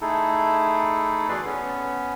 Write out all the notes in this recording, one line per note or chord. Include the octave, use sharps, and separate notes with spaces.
A3 D#4 E4 G#4 A4
E2 B2 G#4 B4 D5 C6
B3 C#4